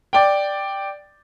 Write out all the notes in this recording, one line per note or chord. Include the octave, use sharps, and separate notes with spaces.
D5 G5